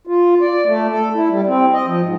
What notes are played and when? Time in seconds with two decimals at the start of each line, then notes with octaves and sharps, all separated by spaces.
0.07 F4
0.41 D5
0.66 A3
0.90 A4
1.14 E4
1.29 G3
1.47 C4
1.73 D#5
1.87 F3
2.02 G#2